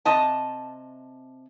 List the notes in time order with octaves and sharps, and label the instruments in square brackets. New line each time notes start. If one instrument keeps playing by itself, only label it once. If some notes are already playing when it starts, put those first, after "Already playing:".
[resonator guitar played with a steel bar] C3 D#5 A5